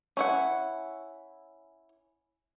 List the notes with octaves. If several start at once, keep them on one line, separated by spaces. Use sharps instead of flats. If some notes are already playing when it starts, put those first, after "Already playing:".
C#4 E4 F#5